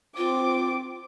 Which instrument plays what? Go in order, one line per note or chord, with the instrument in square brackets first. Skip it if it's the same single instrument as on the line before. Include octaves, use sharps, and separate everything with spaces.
[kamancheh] C4 D6 [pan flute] F4